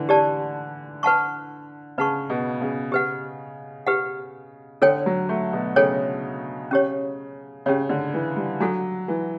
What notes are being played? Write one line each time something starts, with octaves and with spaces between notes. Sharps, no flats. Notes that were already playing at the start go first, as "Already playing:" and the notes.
Already playing: D3 E3
G4 D5 A5
B4 F#5 A5 C#6
C#3 B4 F#5 A5 C#6
B2
C#3
G4 B4 F#5
G4 B4 F#5
D3 A4 C#5 G5
F#3
A3
B2
C#3 A4 C#5 G5
C#4 G4 C#5
C#3 C#4 G4 C#5
D3
E3
G3
F#3 D4 F#4 A4
E3